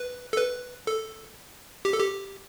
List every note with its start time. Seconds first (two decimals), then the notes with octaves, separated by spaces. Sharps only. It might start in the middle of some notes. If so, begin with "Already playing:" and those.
Already playing: B4
0.33 A4
0.37 B4
0.87 A4
1.85 G4
1.93 A4
1.99 G4